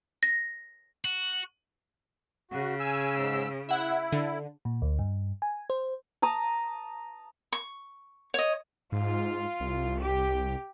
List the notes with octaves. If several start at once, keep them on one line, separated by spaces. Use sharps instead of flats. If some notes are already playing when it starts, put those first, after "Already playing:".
A#6
F#4
C#3 F#4
G#5 E6
G#2 E6
E4 E5 F#5
D3
A#2
D2
G2
G#5
C5
A5 A#5 D#6
C#6
C#5 D#5
G#2 F4
C2
G4